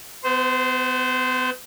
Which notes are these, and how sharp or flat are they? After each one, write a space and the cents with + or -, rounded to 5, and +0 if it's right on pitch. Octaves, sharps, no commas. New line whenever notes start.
B3 +35 C5 -15